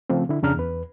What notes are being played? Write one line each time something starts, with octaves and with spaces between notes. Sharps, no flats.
C#3 F3 A3 C4
D3 E4
F2 C#3 D4 A#5 F6
E2 B4